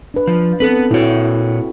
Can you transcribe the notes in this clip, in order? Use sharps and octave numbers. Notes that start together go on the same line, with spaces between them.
D4 B4
F3
B3 C4 A4 B4
A#2 E4 F#4 C#5